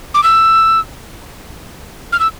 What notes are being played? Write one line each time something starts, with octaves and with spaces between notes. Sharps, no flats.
D6
E6
F6
E6